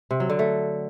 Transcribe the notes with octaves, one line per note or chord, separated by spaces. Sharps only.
C3
F#3
D3
A3